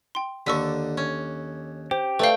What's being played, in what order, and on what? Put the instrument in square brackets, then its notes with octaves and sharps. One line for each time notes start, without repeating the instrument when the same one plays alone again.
[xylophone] G5 C6
[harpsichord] D#2 A#3 A4 [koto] D3 [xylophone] C#6 E6 B6
[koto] C#4
[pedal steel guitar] G4 [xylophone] C5
[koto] A3 G5 [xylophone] B4 D5 F5